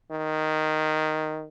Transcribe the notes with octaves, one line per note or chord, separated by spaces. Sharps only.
D#3